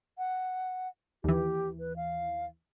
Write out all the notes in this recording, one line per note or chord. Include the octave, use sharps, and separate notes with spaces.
F#5
D#2 E3 G4
B4
F5